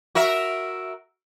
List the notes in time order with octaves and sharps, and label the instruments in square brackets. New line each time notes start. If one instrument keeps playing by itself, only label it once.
[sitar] F#4 A#4 E5